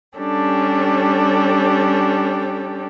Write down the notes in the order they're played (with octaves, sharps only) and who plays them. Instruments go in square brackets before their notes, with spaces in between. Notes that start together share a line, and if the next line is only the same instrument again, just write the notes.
[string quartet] G3 C#4 D4 G4 A4